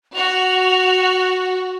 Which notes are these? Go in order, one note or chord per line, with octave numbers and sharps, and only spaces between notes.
F#4 F7